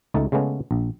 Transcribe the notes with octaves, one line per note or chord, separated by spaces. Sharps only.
C#2 A3 D#4 A5
C#3 G#3 A3 B3 C#4
A#1